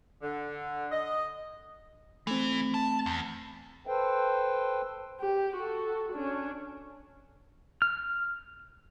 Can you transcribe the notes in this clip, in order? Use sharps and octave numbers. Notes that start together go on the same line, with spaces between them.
D3
D#5
E3 A3 C4
A5
E2
A4 B4 C5 G5
G4
F#4 A4
C#4 D4
F6